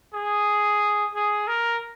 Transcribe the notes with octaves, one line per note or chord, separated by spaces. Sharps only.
G#4
G#4
A#4